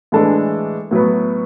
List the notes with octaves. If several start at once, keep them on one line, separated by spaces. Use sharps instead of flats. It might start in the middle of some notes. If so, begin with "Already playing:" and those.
A2 E3 G#3 D4 A4
A2 F#3 B3